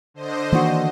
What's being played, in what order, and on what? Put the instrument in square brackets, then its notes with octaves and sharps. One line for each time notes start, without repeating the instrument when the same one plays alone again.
[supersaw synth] D3 C5 D#5
[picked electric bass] D#3 E3 A#3 [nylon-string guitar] C4 D4 F#4